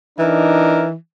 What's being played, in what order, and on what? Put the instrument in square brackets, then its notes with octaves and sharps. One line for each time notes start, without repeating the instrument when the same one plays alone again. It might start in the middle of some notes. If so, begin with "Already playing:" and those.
[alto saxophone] E3 [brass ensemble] D4 D#4 A#4